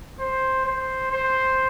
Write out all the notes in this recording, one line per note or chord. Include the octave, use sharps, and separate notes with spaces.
C5
C5
C5